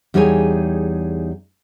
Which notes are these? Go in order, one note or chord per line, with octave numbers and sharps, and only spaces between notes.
E2 G3 D#4 G#4 C#5 G#5